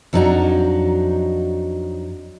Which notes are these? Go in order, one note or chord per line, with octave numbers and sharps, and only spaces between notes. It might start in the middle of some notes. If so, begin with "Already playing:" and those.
F2 F#3 D4 D#4 F#4 A#5